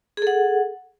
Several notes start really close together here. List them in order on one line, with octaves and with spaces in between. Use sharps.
G#4 A4 F#5